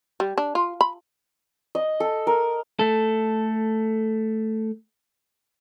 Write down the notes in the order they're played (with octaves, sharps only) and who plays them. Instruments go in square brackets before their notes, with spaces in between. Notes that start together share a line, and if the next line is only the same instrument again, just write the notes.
[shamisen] G3
D4
F4
B5
[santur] D#5
A4
A#4
[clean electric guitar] A3 A4